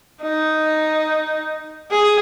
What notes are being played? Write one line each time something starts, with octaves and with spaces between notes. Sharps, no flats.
D#4
G#4